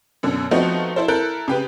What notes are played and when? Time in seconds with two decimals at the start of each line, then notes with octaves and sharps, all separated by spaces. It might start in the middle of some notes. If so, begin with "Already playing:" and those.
0.23 F#2 B2 D3
0.51 F3 A3 B3 C4 D#4 F#4
0.96 E4 A4 C5
1.08 E4 A4 A#4 F#6 G6
1.48 C#3 G4 B4